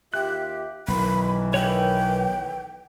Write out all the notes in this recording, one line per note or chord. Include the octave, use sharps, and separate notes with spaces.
D#2 F4 G4 E5 F#6
B1 D#3 E3 B5
A4 B4 C#5 G5